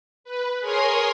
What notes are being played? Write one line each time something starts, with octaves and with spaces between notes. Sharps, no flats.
B4
G#4 A#4 C#5 G#5 C6 D#6